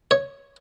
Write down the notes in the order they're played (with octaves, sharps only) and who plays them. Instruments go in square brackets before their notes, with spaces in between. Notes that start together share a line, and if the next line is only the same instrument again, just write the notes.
[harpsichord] C#5